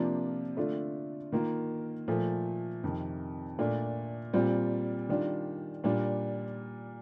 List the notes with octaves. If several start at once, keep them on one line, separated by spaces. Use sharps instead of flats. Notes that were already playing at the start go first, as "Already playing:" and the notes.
Already playing: C3 F3 A#3 D4 F4
D3 A3 D4 F4
D#3 A#3 F4
A#2 F3 A3
F2 C3 D#3
A#2 A3 D4 F4
A#2 G3 C4 F4
D#3 G3 D4 F4
A#2 G3 D4 F4